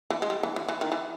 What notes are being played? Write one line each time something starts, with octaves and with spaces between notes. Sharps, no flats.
E3
G#3
G3
E3
E3
E3
D#3
E3